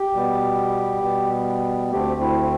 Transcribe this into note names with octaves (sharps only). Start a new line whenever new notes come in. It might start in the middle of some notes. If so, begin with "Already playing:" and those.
Already playing: G4
B2 G3 B3
B2 G3 B3
D2 D3 A3 C4 G4
E4